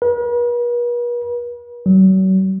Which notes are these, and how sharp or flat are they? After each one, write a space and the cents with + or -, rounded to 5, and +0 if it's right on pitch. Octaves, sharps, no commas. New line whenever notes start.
B4 -45
F#3 +40